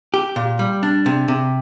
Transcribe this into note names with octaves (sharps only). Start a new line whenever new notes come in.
G4
A#2
G3
D4
C3
C3